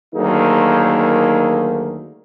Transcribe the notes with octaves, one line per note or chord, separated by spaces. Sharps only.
D2 D#3 F#3 A#3 D#4 G#4